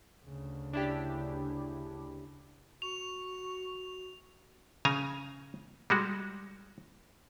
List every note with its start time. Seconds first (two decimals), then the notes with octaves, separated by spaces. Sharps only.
0.24 D2 C#3
0.73 D4 E4 G4
2.82 F#4 C#6 F7
4.85 C#3 G#5 A#5
5.90 G3 G#3 F#4